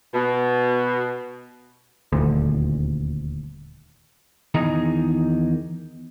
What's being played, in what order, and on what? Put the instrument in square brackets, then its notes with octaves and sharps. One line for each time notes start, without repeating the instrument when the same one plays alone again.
[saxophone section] B2
[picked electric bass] D#1 G#1 D2
[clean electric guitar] E2 D#3 D#4 G#4 D#5 A#5